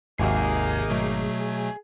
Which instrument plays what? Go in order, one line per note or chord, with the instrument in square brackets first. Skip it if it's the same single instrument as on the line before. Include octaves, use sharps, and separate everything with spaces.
[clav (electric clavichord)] G#1 F#4 E5 [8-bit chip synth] D#2 C3 [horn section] A#3 D#4 [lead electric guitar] G#4
[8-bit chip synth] B2 F#3 A3